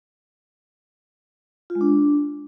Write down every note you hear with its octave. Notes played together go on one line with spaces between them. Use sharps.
F4
G#3
D4